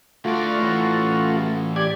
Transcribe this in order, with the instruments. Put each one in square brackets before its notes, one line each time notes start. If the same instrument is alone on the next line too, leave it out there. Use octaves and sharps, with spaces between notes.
[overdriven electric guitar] D2 D5 [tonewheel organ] A3 F4 F#4
[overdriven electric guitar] A2 E3
[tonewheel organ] G4 D5 G#6